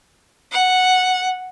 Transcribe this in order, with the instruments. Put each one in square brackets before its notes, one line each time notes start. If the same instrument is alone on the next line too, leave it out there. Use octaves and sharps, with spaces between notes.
[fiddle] F#5